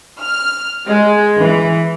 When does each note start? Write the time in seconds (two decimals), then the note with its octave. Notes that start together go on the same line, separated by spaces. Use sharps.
0.23 F6
0.87 G#3
1.39 E3